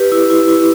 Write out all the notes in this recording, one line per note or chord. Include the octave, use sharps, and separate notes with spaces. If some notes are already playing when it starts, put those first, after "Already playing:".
Already playing: G4 B4
E4
E4
E4